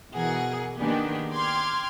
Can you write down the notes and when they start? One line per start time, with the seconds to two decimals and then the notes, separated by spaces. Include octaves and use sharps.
0.12 B2 E3 G#4 A#4 F#5
0.78 D#3 A#3 B3 D4 G4 G#4
1.32 G5 C6 D6 F6 G#6